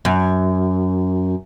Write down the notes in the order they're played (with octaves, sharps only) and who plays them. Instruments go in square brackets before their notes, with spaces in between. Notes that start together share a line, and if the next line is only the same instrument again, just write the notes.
[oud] F#2